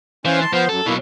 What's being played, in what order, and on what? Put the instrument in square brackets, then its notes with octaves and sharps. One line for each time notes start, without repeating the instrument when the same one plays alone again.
[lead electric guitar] E3 [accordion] C#4 C5 F5
[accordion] A5 C6
[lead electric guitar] F3 [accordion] B3 C5
[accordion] F#2 [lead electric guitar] A4
[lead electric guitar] B2 F#3 [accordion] A#3 E4